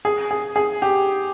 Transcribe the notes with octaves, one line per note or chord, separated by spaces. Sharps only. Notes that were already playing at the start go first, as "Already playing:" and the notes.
G#4
G#4
G#4
G4